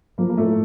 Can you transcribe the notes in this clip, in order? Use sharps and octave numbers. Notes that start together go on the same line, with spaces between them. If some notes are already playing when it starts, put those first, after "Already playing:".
F3 A#3
A#3
A2 A3